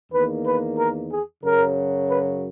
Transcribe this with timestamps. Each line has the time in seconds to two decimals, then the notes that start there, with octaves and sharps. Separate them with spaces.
0.12 E2 D#3 A#3 B4
0.45 B4
0.77 A#4
1.10 G#4
1.43 F#2 C#3 F#3 A#4
2.08 B4